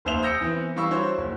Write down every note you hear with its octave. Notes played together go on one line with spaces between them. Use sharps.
F1 D#2 C5 E5 F7
D#6 E6 G6 A#6 C#7 D7
E3 B3 C4 E4 B4
E3 G3 F5 C#6 E6
D4 E4 F#4 C5 C#5
F#1